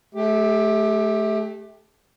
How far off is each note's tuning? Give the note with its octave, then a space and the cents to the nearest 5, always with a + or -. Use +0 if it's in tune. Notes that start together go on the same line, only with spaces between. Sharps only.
A3 -25 G4 +15